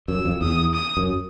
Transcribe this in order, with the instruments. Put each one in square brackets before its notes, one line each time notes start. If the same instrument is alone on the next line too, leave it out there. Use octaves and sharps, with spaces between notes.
[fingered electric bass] F#2 [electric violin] E6
[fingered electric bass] F2
[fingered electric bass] E2 [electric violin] D#6
[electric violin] D#6
[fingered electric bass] F#2